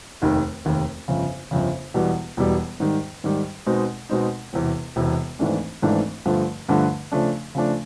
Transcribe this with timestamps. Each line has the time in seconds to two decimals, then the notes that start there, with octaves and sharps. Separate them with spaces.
0.22 F1 D#2 D#3
0.65 F1 D#2 D#3
1.08 G1 F2 C#3
1.51 G1 F2 C#3
1.94 E1 E2 B2 G3 B3
2.37 E1 E2 B2 G3 B3
2.80 G#2 D#3 G3
3.24 G#2 D#3 G3
3.66 B2 G#3 C4 D#4
4.09 B2 G#3 C4 D#4
4.53 E1 E2 C3
4.96 E1 E2 C3
5.39 G#1 G#2 E3 A3 D4
5.82 G#1 G#2 E3 A3 D4
6.25 G2 D3 F3 A3
6.69 G2 D3 F3 A3
7.12 C#3 F3 A3 D4
7.55 C#3 F3 A3 D4